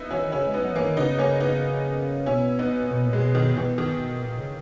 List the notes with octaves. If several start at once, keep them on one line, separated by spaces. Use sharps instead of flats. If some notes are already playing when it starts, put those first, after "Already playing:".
Already playing: B3 D#4 E4
E3 C#4 E4
D#3
C#3 C#4 E4
G#3
B3 D#4
F#3
E3 A#3 C#4
D#3
C#3 B3 D#4
A#3 C#4
B3 D#4
B2 C#4 E4
B3 D#4
B2
A#2
B2 G#3 B3
D#3
B2 E3
D#3
A#2
C#3